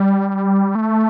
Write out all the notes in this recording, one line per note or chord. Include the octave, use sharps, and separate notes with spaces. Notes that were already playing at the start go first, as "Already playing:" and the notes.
Already playing: G3
A3